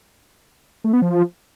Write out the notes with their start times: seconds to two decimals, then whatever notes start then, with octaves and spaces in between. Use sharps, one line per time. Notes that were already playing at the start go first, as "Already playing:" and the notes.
0.84 A3
0.93 B3
1.02 F3